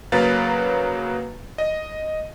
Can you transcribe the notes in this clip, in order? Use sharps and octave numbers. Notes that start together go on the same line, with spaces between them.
C#3 F#3 A#3 B4 F5 A6
D#5